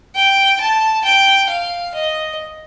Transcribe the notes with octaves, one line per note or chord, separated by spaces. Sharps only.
G5
A5
G5
F5
D#5